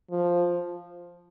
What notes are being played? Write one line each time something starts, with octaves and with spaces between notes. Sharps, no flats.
F3